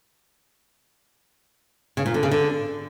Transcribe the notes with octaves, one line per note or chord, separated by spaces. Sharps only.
C#3
A#2
D3
C#3
D3